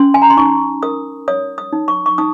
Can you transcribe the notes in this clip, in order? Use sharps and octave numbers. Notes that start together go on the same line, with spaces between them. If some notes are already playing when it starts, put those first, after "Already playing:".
Already playing: C#4 C6
G#5
A#5
C6
D#4 C#6
A#4 D#6
C#5 D#6
D#6
D#4
C#6
C#6
D#4 D#6